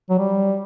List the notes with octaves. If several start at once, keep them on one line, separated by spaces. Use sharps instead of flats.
F#3
G3